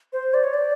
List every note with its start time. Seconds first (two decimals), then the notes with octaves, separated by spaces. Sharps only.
0.13 C5
0.34 D5
0.44 C#5
0.54 D5